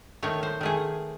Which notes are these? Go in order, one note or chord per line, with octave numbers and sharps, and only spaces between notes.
D#3 A3 C#5
C5
D#3 A3 G#4